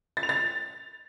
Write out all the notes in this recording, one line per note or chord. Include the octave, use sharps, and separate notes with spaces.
A6
F7
A6